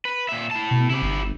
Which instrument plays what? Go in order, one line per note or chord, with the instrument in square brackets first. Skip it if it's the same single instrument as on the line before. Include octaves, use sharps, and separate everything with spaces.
[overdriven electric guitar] B4
A#2 E5
E4 A5
[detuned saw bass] B2
[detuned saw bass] C3 [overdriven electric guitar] E4 G4
[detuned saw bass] G1